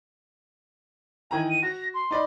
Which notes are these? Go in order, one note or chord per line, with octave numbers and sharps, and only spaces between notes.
D#3 E3 G#5 A#5
D#7
F#4 A#6
C6
D#4 D5 B5